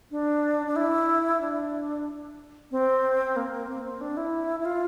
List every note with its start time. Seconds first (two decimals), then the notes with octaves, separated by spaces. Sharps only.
0.11 D4
0.66 D4
0.76 E4
1.41 D4
2.71 C4
3.36 A#3
3.68 C4
3.85 C4
4.01 D4
4.17 E4
4.60 E4
4.65 F4